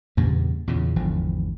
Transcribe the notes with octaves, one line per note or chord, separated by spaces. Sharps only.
E2 G2 A#2 C#3
E2 A#2 C#3
G#1 E2 D3 F3